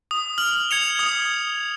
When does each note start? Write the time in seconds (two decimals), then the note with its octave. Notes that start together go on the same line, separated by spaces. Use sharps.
0.11 D#6
0.38 F6 F#7
0.71 G#6 C#7 F7
0.97 D#6 C#7